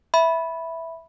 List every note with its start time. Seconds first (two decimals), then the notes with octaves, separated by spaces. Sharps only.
0.14 E5 B5